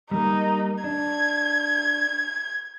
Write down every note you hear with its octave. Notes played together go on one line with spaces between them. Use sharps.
G3 A#3 D#4 A#4
D4 G#6